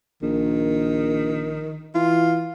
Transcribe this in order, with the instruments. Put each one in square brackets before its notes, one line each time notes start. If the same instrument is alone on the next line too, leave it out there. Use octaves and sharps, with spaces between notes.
[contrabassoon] A#1 [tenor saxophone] D#3
[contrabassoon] E3 [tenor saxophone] F4